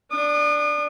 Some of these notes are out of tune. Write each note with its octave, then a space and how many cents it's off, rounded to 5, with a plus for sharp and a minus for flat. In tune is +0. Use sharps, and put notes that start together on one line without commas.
D4 +0 D#6 -40